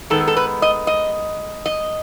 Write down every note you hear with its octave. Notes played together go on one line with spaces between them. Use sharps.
D#3 G#3 B3 A4
A4
B4
D#5
D#5
D#5